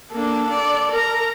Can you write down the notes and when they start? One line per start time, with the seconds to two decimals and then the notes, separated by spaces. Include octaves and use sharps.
0.12 A#3 D4 A4
0.50 D5
0.91 A#4 A#5